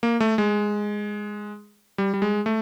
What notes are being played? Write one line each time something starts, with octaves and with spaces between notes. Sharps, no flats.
A#3
A3
G#3
G3
G3
G#3
A3